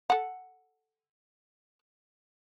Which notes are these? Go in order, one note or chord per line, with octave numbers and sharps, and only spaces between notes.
A4 F#5